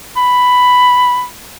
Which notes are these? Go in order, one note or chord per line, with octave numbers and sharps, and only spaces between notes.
B5